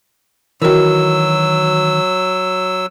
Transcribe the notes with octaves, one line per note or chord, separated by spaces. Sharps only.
D#3 E3 F#3 F#4 A#4 E6